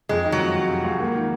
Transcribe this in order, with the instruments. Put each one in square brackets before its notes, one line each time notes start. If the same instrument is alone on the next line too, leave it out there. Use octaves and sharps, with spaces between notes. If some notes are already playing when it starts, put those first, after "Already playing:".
[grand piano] F2 [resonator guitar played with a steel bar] G#3
[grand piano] D#3
[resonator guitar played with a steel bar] F#3
[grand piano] F2
C#2
C3
C#2
A#3
D#3